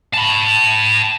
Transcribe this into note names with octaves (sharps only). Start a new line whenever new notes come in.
A5 B5